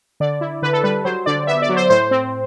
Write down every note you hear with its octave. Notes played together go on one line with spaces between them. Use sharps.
D3 D5
E4
D3 B4
A4
G3 B4
F#3 C5
D3 D5
B3 E5
D5
F#3
C5
A2 C5
C4